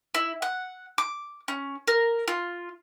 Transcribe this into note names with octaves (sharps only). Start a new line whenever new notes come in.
E4
F#5
D6
C#4
A#4
F4